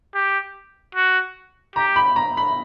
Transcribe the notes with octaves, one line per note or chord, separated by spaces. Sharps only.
G4
F#4
G4 A#5
B5
A#5
B5